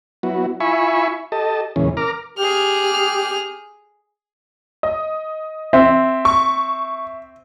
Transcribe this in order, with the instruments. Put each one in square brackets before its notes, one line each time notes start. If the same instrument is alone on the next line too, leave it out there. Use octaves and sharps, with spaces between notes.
[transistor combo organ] F#3 B3 E4 F#4
E4 F4 E5 G#5 B5 C#6
G4 A4 D#5 A5
E2 A#2 C#3 E3 G#3 C#4
A#4 A#5 D6 F6
[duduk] G4 [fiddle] G#4 F6
[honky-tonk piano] D#5
[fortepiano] C4 [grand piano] E5
[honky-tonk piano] C#6